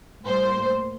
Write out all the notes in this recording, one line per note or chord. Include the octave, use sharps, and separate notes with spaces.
A2 G3 A#3 C5